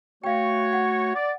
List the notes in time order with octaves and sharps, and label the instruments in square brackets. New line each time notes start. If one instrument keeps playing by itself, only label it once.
[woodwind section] A3 F#4 C#5 [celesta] F5 G5
[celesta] F#5
[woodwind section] D5